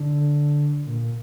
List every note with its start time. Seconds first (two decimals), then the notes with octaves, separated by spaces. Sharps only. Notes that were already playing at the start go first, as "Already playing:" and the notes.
Already playing: D3
0.86 A#2
1.00 A#2